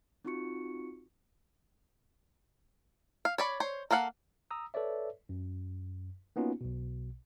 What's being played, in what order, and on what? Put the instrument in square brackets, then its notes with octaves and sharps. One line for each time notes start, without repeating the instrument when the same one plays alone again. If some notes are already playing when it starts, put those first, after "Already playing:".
[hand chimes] C4 D#4 F4 F#4 C#6 C#7
[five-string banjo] F5
C#5 D5 B5
C5 C#5
A#3 A4 F5 F#5
[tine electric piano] A#5 D#6 E6
A4 B4 C#5 D5 E5
F#2
A#3 B3 C#4 D#4 F4 F#4
B1 B2